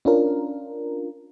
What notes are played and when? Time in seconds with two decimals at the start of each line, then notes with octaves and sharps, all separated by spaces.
0.05 C#4 D4 F4 A#4